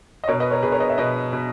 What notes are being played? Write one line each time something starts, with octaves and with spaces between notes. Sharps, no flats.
D#5
B2 A#4 C#5
B4 D#5
A#4 C#5
B2 G#4 B4
A#4 C#5
B4 D#5
C#5 E5
B2 B4 D#5
B2